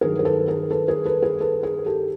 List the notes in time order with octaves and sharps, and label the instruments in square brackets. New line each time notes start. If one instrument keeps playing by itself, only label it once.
[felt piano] G2 D#3 F#3 G#4 A#4
A#4
A4 B4
G#4 A#4
A4 B4
G#4 A#4
A4 B4
G#4 A#4
A4 B4
G#4 A#4
G4 A4